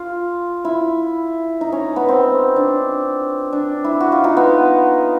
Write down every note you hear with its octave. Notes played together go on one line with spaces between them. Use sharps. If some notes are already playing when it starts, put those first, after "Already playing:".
Already playing: F4
E4
D#4
C#4
B3
C4
D4
D4
E4
F#4
F4
D#4
B3